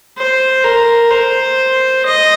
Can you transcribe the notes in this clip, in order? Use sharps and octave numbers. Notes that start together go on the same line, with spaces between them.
C5
A#4
C5
D#5